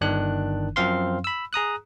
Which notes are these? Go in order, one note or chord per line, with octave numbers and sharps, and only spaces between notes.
G1 D#3 D4 F#6
F#2 F3 C4 F5 C6
B5 E6
G#4 A#5 D#6 F#6